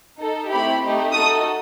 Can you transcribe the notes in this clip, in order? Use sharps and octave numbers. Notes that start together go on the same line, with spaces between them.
D#4 A4
A3 C4 E4 G4 B5
A3 D#4 G4
D#4 F#4 A4 D#6